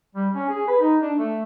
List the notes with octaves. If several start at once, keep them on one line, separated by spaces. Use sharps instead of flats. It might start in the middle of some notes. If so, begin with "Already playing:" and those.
G3
C#4
G#4
B4
D#4
D4
A3